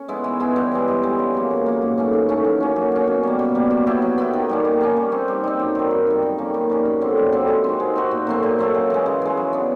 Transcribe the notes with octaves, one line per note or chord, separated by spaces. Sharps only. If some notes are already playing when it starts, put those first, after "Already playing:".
Already playing: C#4
G#3 B3 E4
E3
G#3 B3 E4
G2
E3 G#3
G2
E3 G#3
C#3
F#3 A#3
C#3
F#3 A#3
G#2
E3 A3 C#4
G#2
E3 A3 C#4
F#3
A#3 C#4
F#3
A#3 C#4
B2
G3 A#3
B2
G3 A#3
F#3
B3 E4 G4
F#3
B3 E4 G4
D#3
G3 A#3 C#4
D#3
G3 A#3 C#4
G3
C4 D#4
G3
C4 D#4
F#2
D#3 G3
F#2
D#3 G3
D#3
G3 A#3 C#4
D#3
G3 A#3 C#4
F#2
D3 G3 C4
F#2
D3 G3 C4
G#3
C4 D#4 F#4
G#3
C4 D#4 F#4
A#2
F#3 A3 C4
A#2
F#3 A3 C4
C#3
E3 G#3
C#3
E3 G#3
F#3
B3 D4